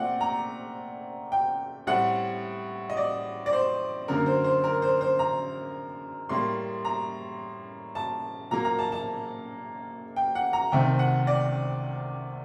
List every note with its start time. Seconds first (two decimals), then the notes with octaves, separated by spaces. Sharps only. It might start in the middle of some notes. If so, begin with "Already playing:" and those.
Already playing: A#2 A3 C4 D5 F#5
0.21 A#5
1.32 G5
1.87 A2 G3 C4 F#5
2.90 D#5
2.97 D5
3.46 D5
3.53 C5
4.08 F#2 D3 F#3 A#3 A#4
4.26 C5
4.44 C5
4.64 A#4
4.82 C5
5.01 C5
5.19 A#5
6.29 A2 G3 A#3 C6
6.85 A#5
7.95 A5
8.51 A#2 F#3 A#3 A#5
8.65 A#5
8.79 A5
8.92 A5
10.16 G5
10.35 F#5
10.53 A#5
10.72 C2 C3 D#3 A3 C4 G5
10.99 F#5
11.27 D5